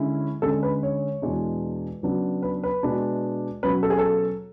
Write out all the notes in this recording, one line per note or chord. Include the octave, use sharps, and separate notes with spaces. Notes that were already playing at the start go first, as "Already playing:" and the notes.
Already playing: D3 G#3 C#4 E4
D3 G#3 C#4 A4
B4
C#5
E2 B2 G#3 D4
C#3 F#3 B3 D4
B4
B4
B2 G#3 D4
B2 F#3 C#4 B4
A4
G#4
A4